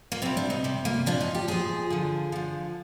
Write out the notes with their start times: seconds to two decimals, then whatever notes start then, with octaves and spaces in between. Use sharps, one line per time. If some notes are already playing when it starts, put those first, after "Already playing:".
0.12 A#3
0.22 C3 G3 C4
0.37 D4
0.50 D#4
0.64 C3 G3
0.85 A#3
1.06 A#2 F3 D4
1.21 D#4
1.35 G4
1.48 A#2 F3 G#4
1.90 D3 F3
2.32 D3 F3